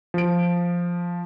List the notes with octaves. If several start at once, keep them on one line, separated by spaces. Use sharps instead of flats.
F3 D7